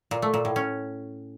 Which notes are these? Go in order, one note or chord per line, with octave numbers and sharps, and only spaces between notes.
A#2
A3
A#2
A2
C#4